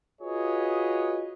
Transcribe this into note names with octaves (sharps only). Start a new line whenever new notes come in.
F4 F#4 G#4 B4 C#5 D#5